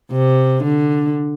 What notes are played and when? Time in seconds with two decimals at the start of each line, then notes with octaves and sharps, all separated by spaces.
0.12 C3
0.64 D3